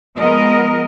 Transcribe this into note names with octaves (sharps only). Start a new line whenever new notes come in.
F3 G#3 B3 A#4 D#5